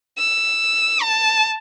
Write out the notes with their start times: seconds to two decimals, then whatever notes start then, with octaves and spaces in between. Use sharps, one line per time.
0.18 E6
1.02 A5